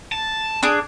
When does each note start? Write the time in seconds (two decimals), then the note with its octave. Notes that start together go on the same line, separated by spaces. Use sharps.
0.12 A5
0.63 D4 G#4 D6